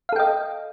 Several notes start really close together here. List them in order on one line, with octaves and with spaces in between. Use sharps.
F5 A4 G5 D#5